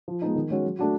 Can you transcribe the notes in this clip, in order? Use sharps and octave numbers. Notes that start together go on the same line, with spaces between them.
F3
G#3 B3 D#4
D#3
G#3 C#4 F#4
F#3
A3 D4 F#4